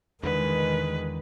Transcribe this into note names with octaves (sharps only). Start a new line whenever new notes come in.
E2 D3 D#3 G#3 B4